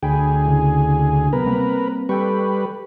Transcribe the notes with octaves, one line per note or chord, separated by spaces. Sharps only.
D2 G#4 G5 B5
C#3 E4
C3 F#3 B3 A#4 B4
G3 A#3 C4
G3 A4 B4 G5 C#6